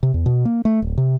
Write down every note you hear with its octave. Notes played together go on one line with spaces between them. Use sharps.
C3
E2
B2
A#3
A3
D1
C3